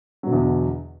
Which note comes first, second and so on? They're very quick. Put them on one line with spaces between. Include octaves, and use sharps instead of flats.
F#3 B2 D3 E2